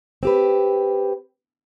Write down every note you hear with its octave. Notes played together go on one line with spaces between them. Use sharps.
C4 G4 B4